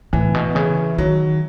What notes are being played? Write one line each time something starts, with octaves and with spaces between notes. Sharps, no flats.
A2 E3
B2
C#3 E3
D#3 F#3